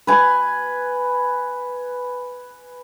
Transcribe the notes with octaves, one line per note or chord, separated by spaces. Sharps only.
B4 G#5